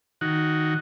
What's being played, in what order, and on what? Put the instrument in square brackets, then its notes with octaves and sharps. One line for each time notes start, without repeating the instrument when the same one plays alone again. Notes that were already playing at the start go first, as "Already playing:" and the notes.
[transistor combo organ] D#3 F#4